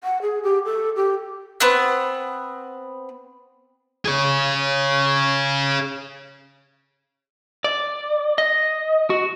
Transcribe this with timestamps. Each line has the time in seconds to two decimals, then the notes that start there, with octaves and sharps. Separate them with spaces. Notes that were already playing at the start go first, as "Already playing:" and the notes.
0.04 F#5
0.22 G#4
0.43 G4
0.65 A4
0.96 G4
1.60 B3 C4 F#5 F#6
4.05 G#4 C#5
7.64 D5
8.38 D#5
9.10 F#4